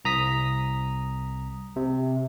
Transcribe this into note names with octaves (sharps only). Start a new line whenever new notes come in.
C2 A#5 D#6 B6
C3